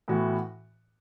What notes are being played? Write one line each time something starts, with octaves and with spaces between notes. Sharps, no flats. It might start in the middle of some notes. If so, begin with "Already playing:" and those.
A2 E3 B3 F#4